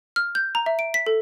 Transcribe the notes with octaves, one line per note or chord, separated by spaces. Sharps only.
F6
G6
A#5
E5
D7
B6
A4